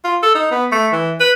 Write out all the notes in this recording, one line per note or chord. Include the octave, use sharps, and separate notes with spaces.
F4
A4
D#4
B3
A3
E3
B4